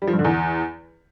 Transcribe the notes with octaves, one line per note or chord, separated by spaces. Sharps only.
G3
F3
G2
D3
E2